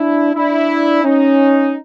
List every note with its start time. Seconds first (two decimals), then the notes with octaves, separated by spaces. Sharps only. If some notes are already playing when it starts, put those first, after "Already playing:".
Already playing: D4 E4
0.34 D4 E4
1.04 C#4 D#4